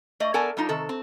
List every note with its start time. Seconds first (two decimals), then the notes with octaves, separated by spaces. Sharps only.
0.20 A3 D5 D#5
0.34 B3 A4 A#4 D5 G#5 A5
0.57 G3 D4 D#4 F4
0.69 C3 D#3 A4
0.89 C4